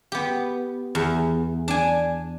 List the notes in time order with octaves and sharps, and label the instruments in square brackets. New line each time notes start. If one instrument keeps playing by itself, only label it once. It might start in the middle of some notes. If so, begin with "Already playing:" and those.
[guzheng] B3 G4
E2
D4 G#5